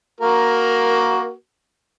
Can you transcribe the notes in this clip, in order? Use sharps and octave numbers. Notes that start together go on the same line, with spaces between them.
A#3 F#4 A#4